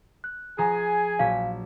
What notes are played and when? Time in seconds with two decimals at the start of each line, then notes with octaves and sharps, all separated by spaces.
0.24 F#6
0.58 F3 G#4 G#5 A#5
1.19 A#1 F#3 F5 B6